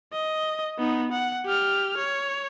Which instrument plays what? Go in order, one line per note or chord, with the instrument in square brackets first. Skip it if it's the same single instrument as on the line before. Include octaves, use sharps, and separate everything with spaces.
[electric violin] D#5
B3 D#4
F#5
G4 F6
C#5